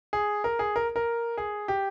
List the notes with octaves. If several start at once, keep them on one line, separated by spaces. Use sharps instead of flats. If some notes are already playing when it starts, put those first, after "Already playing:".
G#4
A#4
G#4
A#4
A#4
G#4
G4